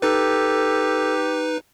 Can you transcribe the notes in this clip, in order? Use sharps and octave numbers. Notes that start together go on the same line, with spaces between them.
D#4 G4 A4 B4